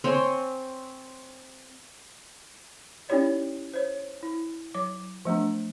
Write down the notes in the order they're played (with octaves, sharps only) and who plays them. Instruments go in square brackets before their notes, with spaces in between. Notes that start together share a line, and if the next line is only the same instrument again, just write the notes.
[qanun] C4 C#5 G#5
[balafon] C#4 D#4 E4 G4 C#5 D5
C5 C#5
E4
F#3 D6
F3 A3 B3 D4